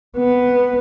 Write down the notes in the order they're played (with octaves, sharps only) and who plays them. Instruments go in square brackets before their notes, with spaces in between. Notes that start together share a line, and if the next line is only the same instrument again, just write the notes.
[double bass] B3